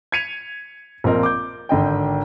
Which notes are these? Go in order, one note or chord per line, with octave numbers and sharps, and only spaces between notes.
G#6 B6 C#7 D#7 F7
A#1 F3 C4 A#4 D#5
D6 G6
G#1 D3 D#5 G5